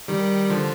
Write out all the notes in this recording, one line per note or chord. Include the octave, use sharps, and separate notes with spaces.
D#3 G3
D3 F3